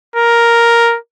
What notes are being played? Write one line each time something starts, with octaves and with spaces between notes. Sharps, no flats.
A#4